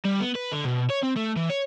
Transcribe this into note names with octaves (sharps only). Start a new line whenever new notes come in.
G3
B3
B4
D3
B2
C#5
C4
A3
E3
C#5